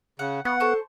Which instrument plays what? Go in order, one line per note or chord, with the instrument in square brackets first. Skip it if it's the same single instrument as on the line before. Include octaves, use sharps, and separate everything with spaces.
[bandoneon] C#3 [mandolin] F#5
[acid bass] B3 [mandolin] F4 [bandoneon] F#5 [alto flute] C#6
[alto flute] A4 [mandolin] C5 A5 C#6